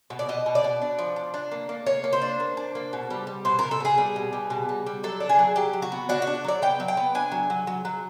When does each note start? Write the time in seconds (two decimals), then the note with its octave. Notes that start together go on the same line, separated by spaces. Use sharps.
0.10 B2
0.19 D5
0.29 B2 D#5
0.46 B2
0.55 D5
0.64 B2
0.81 D4
0.99 F3
1.16 D4
1.34 D4
1.51 A#3
1.69 A#3
1.86 A#3 C#5
2.04 A#3
2.13 C5
2.22 D4
2.40 A#3
2.57 D4
2.75 A#3
2.93 B2
3.11 G3
3.27 G3
3.45 B2 C5
3.59 B2 A#4
3.71 A4
3.80 B2 G#4
3.98 G3
4.16 B2
4.33 G3
4.50 B2
4.69 G3
4.86 G3
5.03 F#3 A4
5.20 D4
5.29 G#4
5.39 F#3
5.56 F#3 G4
5.73 F#3
5.82 F#4
5.92 B3
6.09 D4 F#4
6.22 F#4
6.27 D4
6.44 F#3 D5
6.62 B3 G5
6.80 F#3
6.88 G5
6.97 B3
7.15 D4 G#5
7.32 F#3
7.50 F#3
7.67 F#3
7.85 F#3